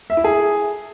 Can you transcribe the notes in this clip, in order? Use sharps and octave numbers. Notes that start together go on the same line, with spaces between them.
E5
E4
G#4